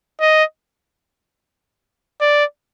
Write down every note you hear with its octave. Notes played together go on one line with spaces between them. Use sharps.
D#5
D5